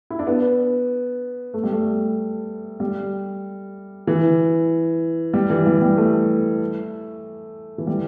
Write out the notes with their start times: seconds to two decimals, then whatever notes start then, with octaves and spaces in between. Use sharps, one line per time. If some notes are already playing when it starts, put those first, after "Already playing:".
0.10 E4
0.19 D4
0.27 B3
1.54 A3
1.63 G3
1.73 A3
2.80 G3
4.07 E3
5.34 G3
5.50 E3
5.66 G3
5.82 G3
5.97 A3
7.78 E3
7.87 G3